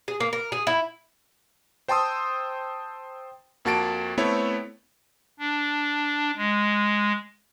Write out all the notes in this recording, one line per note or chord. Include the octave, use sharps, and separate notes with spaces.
G#4
A#3
A#4
G#4
E4
C5 G5 A5 C6 D#6 E6
F2 A#3 F#4 A5 A6 D7
A3 B3 C4 E4 A4 C#5
D4
G#3